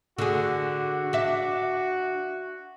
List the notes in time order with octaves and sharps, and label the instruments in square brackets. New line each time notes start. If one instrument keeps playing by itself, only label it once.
[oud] D3 G#4 [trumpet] F#4
[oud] D4 E5